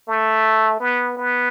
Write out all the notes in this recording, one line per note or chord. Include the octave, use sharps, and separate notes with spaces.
A3
B3
B3